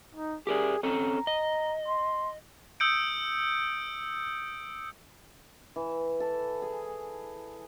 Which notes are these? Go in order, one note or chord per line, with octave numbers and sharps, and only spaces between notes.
D#4
G4 G#4 A#4 D5
C4 C#4 A4 A#5
D#5
C6
D#6 E6 G6 C#7 D7
E3
A4
G#4